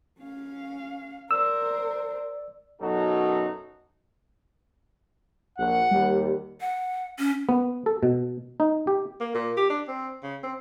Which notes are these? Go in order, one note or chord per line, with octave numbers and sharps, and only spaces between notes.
C#4 F5
A#4 C5 D5 E6
F#2 B2 F#3 D#4 F#4 A4
A#1 F#5
D#2 G3
F#5
C#4
B3
A4
B2
D#4
G4
A#3
A#2
G4
D4
C4
C#3
C4